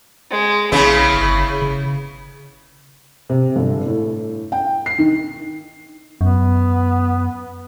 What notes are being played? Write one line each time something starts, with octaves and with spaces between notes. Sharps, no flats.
G#3
A#1 C#3 B3 E4
G1
C#3
C3
G1
A2
G5
C7
D#3
F#2 B3